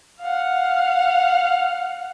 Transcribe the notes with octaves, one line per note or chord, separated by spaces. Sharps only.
F5 F#5